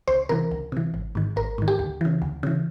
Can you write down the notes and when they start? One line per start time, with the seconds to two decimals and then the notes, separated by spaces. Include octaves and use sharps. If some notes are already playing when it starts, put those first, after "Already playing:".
0.08 C#2 C5
0.29 C3 E3 A#4
0.51 C#2
0.72 C3 E3
0.94 G#1
1.15 G#2 D#3
1.36 G#1 A#4
1.58 G#2 D#3
1.68 G4
1.79 D2
2.01 C#3 E3
2.22 D2
2.43 C#3 E3